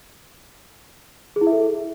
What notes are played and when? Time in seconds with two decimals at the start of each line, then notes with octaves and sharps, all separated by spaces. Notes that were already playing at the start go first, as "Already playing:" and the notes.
1.36 G#4
1.41 E4
1.47 E5
1.52 A4